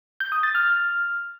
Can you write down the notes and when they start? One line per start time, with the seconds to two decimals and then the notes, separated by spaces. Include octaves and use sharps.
0.20 G6
0.32 D#6
0.43 A6
0.55 F6